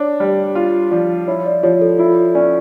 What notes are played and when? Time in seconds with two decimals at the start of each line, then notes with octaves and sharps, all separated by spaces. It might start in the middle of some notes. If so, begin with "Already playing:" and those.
Already playing: D4 C#5
0.20 G3
0.55 F4
0.91 F3 D5
1.28 E4 C#5
1.46 D5
1.63 F3 C#5
1.81 A4
1.99 E4 F4
2.35 C#4 D5